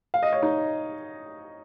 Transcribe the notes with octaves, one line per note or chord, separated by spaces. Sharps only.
F5
D#5
C#5
D#4